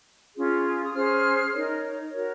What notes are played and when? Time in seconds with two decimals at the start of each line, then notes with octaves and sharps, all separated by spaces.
0.35 C#4 F4 G#4
0.84 D#6
0.94 C#4 G#4 C5 F6
1.52 D#4 A#4 C#5
2.11 F#4 A#4 C#5